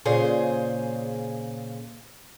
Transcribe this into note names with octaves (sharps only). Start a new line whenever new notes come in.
A#2 C#3 G#4 C5